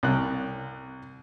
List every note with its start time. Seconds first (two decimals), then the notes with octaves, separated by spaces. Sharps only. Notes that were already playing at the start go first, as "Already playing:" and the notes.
0.03 C2 F#6